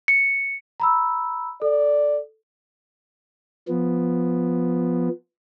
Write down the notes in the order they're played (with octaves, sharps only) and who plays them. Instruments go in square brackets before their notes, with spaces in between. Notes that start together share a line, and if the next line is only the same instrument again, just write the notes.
[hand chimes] C#7
[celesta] A#5 B5 E6
[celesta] A4 [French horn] D5
[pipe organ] F3 B3